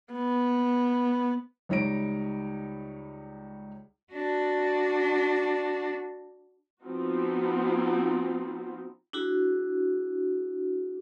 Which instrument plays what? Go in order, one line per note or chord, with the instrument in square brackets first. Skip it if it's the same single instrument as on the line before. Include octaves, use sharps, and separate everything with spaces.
[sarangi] B3
[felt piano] C#2 G3 D#4 C#5 A#6 D7
[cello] D4 F#4
[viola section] F3 B3 C4 D#4 F4 F#4
[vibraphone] D4 E4 F#4 G#4